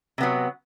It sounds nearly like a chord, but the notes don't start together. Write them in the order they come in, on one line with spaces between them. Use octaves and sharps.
C3 B3 F#3